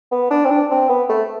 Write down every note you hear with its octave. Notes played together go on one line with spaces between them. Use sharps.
B3
D4
C4
D4
C4
B3
A3